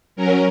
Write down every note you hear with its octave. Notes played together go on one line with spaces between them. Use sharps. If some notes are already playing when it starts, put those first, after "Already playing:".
F#3 C#4 A#4